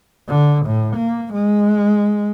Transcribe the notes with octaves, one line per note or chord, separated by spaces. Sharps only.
D3
A2
A#3
G#3